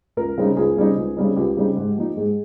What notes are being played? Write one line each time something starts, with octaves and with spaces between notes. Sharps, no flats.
C#2 A#4
C#3 G3 C4 D#4
C#2 G#4
C#3 G3 C4 D#4
C#2
C#3 G3 C4 D#4
C#2 G4
C#3 G3 C4 D#4
G#2
F3 A#3 D#4
G#2 G#4